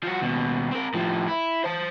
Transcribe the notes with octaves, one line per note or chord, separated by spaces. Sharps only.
F3 F#4
D#2 B2
C4 A#4
A2 F3
E4
C5 A5